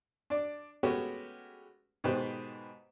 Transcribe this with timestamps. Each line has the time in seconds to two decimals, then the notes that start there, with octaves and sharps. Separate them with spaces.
0.30 D4 D5
0.83 G#3 A3 B3 C#4 F#4 G4
2.04 G#2 B2 D#3 G4 B4 C5